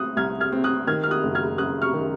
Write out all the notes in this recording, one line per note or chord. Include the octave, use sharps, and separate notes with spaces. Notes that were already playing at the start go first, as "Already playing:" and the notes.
Already playing: C4 C#6 D#6 F#6
C2 F6 G#6
F6 G#6
C4
D#6 F#6
D#3 F6 G#6
F6
D#6 F#6
F#1
F6 G#6
F#1 D#6 F#6
C#6 F6
D#3